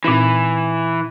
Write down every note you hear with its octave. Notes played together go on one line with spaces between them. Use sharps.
A#2 E3 C4 D#4